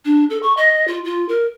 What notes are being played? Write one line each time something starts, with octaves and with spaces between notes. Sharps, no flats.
D4
A4
C#6
D#5
F4
F4
A#4